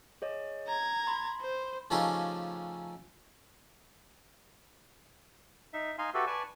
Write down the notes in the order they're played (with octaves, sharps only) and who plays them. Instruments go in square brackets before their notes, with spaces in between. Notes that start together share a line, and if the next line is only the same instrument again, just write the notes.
[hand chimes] G#4 C#5 D#5
[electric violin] A#5 G#6
[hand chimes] B5 C6
[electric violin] C5
[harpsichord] C#3 F3 A3 C#4 D#4 G4
[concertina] D#4 E5
D#4 F5 G#5 C6
F#4 G4 A4 B4 E5
B4 D5 G#5 A5 C#6